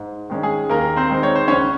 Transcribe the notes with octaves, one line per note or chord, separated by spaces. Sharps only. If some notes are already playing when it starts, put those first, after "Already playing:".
Already playing: G#2
D#3 G#3 C#4
G#4
D#2 A#3 A#4
C4 C5
D#3 G#3 C4 D#4
C#5
C5
C#2 C#4 C#5